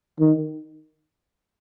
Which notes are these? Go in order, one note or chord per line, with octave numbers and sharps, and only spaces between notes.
D#3